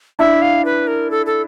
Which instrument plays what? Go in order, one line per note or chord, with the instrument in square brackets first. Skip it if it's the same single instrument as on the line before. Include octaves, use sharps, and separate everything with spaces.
[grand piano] D4 E4 [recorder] E5
[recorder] F5
B4
A#4
A4
A4